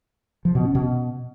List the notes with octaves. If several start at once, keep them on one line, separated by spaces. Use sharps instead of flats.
F3
B2
C#4
B2